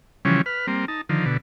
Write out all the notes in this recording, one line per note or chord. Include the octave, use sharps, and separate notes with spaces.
C#3 E3 F3 G3 C#4
B4 F6
G3 A#3 C4
D#4 A5
D3 D#3 F3
B2 D3